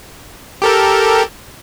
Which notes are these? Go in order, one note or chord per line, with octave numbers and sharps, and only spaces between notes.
G4 A4 A#4